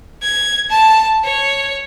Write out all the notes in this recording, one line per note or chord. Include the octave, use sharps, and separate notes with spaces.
G#6
A5
C#5